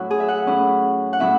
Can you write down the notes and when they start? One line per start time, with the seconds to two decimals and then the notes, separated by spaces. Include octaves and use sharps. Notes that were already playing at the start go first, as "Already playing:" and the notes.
Already playing: A2 F#3 C#4 E4 F#4
0.11 G#4
0.20 E5
0.28 F#5
0.47 A2 F#3 C#4 E4
1.13 F#5
1.20 A2 F#3 C#4 E4 E5